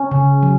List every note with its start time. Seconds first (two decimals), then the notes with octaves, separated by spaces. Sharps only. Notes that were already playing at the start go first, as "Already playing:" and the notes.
Already playing: C#4
0.11 C#3
0.43 F#3